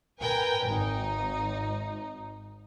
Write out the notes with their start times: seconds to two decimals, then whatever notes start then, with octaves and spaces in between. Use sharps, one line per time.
0.19 A#4 B4 G5 G#5
0.65 G#1 D#4